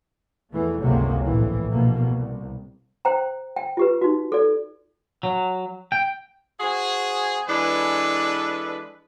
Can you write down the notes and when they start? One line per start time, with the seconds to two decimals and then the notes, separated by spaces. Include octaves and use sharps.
0.52 E2 E3 A3
0.82 G1 C#2 C3 F#3 A#3
1.24 A#1 A2 E3
1.72 A#1 B2 A#3
2.11 C2
3.05 C5 G5 A#5
3.56 G5
3.77 F4 G4 B4
4.01 D#4 F#4
4.32 A4 D5
5.23 F#3
5.92 G5
6.60 C4 F#4 G#4
7.48 E3 G#3 D4 A4 B4